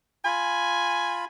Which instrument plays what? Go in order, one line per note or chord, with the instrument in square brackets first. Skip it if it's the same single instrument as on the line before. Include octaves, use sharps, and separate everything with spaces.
[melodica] F4 B5 [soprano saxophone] G#5